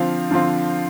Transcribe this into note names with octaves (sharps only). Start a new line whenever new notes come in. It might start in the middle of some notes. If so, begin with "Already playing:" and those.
Already playing: D3 F3 C4 F4 F5
D3 F3 C4 F4